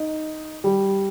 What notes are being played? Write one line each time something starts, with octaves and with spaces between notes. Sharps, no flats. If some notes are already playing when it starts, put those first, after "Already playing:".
Already playing: D#4
G3